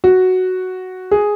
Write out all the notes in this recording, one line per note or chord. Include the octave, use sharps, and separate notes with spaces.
F#4
G#4